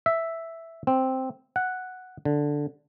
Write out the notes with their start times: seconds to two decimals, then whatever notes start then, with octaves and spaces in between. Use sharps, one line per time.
0.06 E5
0.87 C4
1.56 F#5
2.25 D3